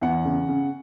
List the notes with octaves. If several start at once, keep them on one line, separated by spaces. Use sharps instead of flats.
E2 F#5
C#3
C#3